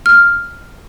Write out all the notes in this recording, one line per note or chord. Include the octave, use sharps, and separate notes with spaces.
F6